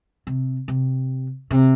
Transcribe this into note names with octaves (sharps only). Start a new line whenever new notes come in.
C3
C3
C3